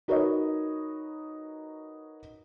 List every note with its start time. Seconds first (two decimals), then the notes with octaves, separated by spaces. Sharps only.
0.08 D#4 F#4 A#4 B4 C#5 D#5